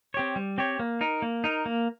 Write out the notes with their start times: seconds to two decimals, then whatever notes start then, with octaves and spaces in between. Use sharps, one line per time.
0.14 C4 G4 C#5
0.36 G3
0.58 C4 G4 C#5
0.79 A#3
1.01 D#4 A#4
1.22 A#3
1.44 D#4 A#4
1.66 A#3